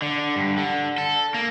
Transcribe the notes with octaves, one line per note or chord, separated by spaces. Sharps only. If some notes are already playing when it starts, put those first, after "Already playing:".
D3
G2
D3
A4
A#3